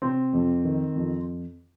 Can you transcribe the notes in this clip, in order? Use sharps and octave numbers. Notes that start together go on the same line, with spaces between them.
C3 C4
F2
D#3
F2